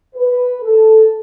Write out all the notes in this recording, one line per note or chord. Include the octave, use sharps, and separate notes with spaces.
B4
A4